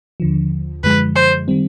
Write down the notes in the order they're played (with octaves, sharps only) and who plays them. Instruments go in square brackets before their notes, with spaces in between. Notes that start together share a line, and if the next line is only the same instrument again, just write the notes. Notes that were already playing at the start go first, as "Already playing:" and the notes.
[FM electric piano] D#2 D3 F3
[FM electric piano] F#2 D3 F3 G#3 [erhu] B4
[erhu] C5
[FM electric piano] D#3 G3 C4